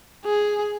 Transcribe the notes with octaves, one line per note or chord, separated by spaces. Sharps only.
G#4